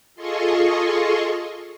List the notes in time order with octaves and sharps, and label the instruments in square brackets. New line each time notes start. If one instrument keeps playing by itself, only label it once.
[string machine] F4 G#4 A4 D#5 C6 C#6